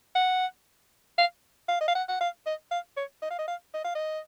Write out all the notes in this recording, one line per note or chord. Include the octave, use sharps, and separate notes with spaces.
F#5
F5
F5
D#5
F5
F#5
F#5
F5
D#5
F5
C#5
D#5
F5
D#5
F5
D#5
F5
D#5